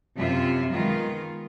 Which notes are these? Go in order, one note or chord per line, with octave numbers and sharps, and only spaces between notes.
F#2 C3 F4 E5
D#3 G#3 B3 F4